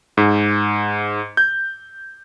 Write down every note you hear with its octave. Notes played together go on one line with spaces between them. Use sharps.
G#2
G6